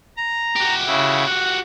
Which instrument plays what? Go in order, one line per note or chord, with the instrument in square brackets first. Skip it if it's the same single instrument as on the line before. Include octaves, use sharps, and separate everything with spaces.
[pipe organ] A#5
[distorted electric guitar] F#4 G4
[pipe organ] C#3 E4
F#5